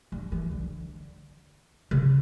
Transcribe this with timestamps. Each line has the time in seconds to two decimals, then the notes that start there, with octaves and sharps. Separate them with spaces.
0.12 G2
0.32 E3
0.51 D3
1.91 C#3